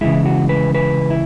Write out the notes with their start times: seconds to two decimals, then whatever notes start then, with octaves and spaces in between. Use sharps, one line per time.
0.01 C#3 E3 G#3 E4
0.26 F#4
0.49 B4
0.75 B4
1.10 E4